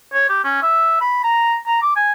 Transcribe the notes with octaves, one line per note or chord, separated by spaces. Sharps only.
C#5
G4
C#4
E5
B5
A#5
A#5
D6
G#5